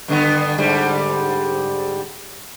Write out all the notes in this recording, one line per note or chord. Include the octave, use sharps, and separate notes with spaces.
G2 D3 B3
G#2 D3 G3